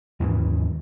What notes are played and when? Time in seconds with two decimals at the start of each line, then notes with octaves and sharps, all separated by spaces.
0.20 D#2 G#2 D#3 E3